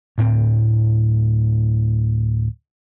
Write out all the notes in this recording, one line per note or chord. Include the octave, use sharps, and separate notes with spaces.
D2 A2 C4